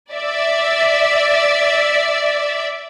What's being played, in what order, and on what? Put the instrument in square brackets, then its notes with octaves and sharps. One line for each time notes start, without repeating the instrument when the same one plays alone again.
[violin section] D5 E5